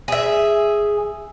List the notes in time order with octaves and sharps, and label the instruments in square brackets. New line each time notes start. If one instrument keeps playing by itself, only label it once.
[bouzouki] G#4 E5